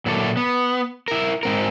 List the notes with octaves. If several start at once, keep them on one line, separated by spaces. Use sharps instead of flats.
A#2 F#3 E4 A4 A#4 D5
B3
E4 A#4
G#2 C4 A#4